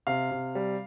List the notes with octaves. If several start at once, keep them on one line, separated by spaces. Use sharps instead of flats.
C3 F5
C3
G3